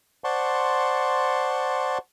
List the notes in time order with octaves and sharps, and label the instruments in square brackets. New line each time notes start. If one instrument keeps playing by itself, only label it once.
[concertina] C5 D5 F#5 A5 C6 C#6